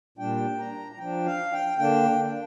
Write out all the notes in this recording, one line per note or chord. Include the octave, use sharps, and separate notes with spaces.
A#2 G3 D4 G5
A#5
A#5
F3 D4 G5
F5
G5
D3 A#3 D4 G5